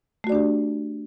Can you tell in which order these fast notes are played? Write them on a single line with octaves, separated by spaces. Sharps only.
A3 F#4 D5 D4 G4